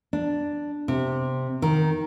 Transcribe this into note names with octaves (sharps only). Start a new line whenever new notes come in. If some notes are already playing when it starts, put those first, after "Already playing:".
D4
C3
D#3